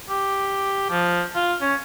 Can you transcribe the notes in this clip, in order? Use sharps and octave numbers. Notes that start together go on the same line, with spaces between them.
G4
F3
F4
C#4